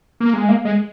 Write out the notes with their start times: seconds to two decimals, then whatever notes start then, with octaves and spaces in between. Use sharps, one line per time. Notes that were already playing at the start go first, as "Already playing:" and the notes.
0.20 A#3
0.34 G#3
0.49 A#3
0.65 G#3